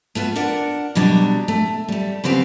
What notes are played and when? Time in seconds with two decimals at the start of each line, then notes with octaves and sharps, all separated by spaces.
0.15 A3 B3 F4 F#4
0.36 D4 A#4 F#5
0.95 B2 F#3 G3 D4
1.48 A3
1.88 G3 A3
2.24 C#3 B3 C4 G4 F5